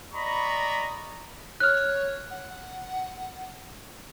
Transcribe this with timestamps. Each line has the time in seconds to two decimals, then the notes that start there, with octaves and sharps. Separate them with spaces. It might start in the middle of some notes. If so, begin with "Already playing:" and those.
0.13 D5 D#5 A#5 B5 C#6
1.60 C#5 F6 F#6
2.30 F#5